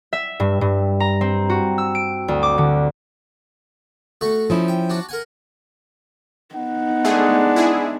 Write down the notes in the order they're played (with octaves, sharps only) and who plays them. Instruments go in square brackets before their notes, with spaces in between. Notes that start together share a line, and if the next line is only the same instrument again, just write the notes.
[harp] E5
G2
G2
A#5
C4
F#4
E6
D7
D2
D6
D3
[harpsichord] A3 F#4 C#6
[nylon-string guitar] F3 C#4 E4 [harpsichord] D#4
[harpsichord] G5
D4 F#4
A#4 F#5 G#5
[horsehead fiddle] B3 D#4 [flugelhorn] F#5
[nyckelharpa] G#3 D4 [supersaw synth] A3 G#4
[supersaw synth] E4 G#4